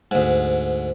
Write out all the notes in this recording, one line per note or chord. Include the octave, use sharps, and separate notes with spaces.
D2 G#2